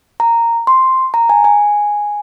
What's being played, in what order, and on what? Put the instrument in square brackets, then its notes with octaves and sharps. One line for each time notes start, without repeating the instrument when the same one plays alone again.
[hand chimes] A#5
C6
A#5
G#5
G#5